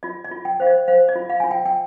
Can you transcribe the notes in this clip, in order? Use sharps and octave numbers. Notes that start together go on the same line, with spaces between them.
F4 D#5
D#5
F4
G5
C5 F5
D#5
C5 F5
D#5
F4
F5
F4 G#5
G5
G5